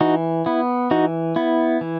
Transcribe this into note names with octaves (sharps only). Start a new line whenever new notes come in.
E3 D#4 F#4
B3 E4
E3 D#4 F#4
B3 E4
E3